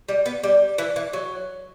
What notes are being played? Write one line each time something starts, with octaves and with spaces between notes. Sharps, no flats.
G3
B3
G3
E3
E3
F#3